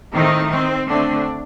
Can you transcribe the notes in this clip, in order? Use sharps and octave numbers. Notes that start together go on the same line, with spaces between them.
A2 D#3 A3 C4 D#4
C4
D3 A3 C4 D4